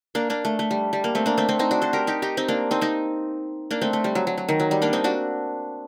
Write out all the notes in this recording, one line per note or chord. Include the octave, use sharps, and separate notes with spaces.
A#3 D4
A#3 D4
A3
A3
G3
G3
A#3
A3 C4
A#3 D4
A3 C4
A3 C4
C4 D#4
D4 F#4
A4 C5
G4 A#4
D#4 G4
D#4 G4
C4 D#4
A#3 D4
C4 D#4
C4 D#4
A#3 D4
A3 C4
A3
G3
F#3
F#3
F#3
D#3
F#3
G3
A#3 D4
C4 D#4
D4 F#4